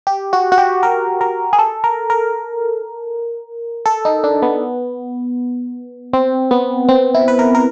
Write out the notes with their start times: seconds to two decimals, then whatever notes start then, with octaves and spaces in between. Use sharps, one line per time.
0.07 G4
0.33 F#4
0.52 F#4
0.58 G4
0.83 A#4
1.21 A#4
1.53 G#4
1.59 A4
1.84 A#4
2.10 A#4
3.86 A4
4.05 D#4
4.24 D4
4.42 B3
6.13 C4
6.51 B3
6.89 C4
7.15 E4
7.28 B4
7.39 A#4
7.55 A#4